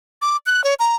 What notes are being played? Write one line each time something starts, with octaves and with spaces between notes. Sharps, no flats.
D6
F#6
C#5
A#5